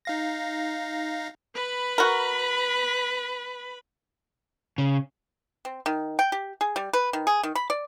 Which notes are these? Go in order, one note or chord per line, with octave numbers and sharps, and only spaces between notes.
D#4 F5 A#6
B4 B5
F#4 A#4
C#3
C4
D#3
G5
G4
G#4
G3
B4
D#3
G#4
D#3
B5
D5